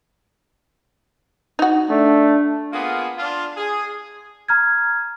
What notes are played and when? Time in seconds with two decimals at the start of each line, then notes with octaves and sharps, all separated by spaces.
1.59 D#4 F#4
1.90 A3 D4
2.72 A#3 B3 F4 G#4
3.18 D4 F4
3.57 G#4
4.48 A#5 F6 G#6